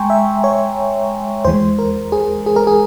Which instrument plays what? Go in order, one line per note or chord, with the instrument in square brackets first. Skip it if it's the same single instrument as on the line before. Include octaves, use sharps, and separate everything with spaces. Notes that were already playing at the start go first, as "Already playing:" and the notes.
Already playing: [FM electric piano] G#3 G5 G#5 A#5 C6 C#6
E5
C#5
E2 E3 G#3 C5
A#4
G#4
G#4
A#4
G#4